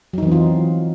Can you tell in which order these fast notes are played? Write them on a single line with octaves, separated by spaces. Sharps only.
F#3 D#4 E3 C4 F4